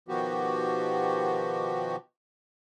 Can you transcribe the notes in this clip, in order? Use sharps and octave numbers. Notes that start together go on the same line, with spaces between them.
B2 D#3 F3 B3 F#4 G4